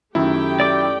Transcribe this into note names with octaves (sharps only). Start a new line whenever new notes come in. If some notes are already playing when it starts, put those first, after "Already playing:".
F#2 D#3 A3 E4 G4 G5
D5 D6